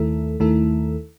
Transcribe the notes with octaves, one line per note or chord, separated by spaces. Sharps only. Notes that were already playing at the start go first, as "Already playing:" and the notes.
Already playing: D#2 D#3 A3 E4 A4
D#2 D#3 A3 E4 A4